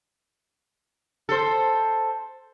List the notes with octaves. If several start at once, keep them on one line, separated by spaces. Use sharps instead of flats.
A4 C5